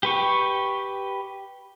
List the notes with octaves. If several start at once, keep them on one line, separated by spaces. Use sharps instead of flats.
G4 B4 C#6